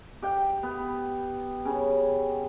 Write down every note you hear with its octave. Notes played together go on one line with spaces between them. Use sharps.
G4 G5
B3
C#3